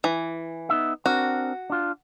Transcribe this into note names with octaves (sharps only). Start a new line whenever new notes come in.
E3
B3 D#4 E5
C4 D4 F#4 A#4
D4 F4